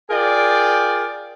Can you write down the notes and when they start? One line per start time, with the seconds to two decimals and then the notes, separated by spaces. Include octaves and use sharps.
0.11 F4 G#4 A#4 D5 G5